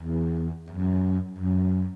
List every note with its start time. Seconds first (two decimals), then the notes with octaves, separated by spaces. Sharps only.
0.01 E2
0.70 F#2
1.39 F#2